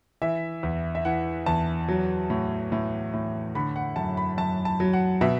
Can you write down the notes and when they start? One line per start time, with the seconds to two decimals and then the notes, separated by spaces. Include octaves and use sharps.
0.22 E3 E5
0.63 E2
0.95 E5
1.05 E3 F#5
1.46 E2 A5
1.88 F#3
2.30 A2
2.72 A2
3.14 A2
3.55 D3 B5
3.76 F#5
3.96 F#2 A5
4.17 B5
4.38 F#2 A5
4.65 A5
4.80 F#3
4.93 F#5
5.21 B2 E5